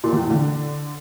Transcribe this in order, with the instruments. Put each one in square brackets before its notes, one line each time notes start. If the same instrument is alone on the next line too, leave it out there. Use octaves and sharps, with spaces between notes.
[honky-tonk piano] A#2
E2
A2
D3